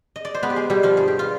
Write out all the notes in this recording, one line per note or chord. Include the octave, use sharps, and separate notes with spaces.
D#5
D5
C5
G#3 B3 B4
G4
G#3 G#4
B2 G3 G4
F3 F4
G2 G#4
G4
G3 F4